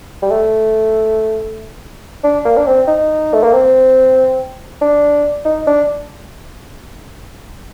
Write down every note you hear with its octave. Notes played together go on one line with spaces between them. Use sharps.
G3
A3
D4
A#3
D4
C4
D#4
A3
A#3
C4
D4
D#4
D4